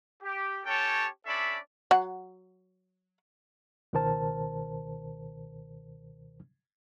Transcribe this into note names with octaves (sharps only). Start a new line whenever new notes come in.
G4
C#4 G4 A4 C#5 G5 A5
C#4 D4 A4 D5 E5 B5
F#3 F#5
C#2 B2 D#3 A#4 C5 A5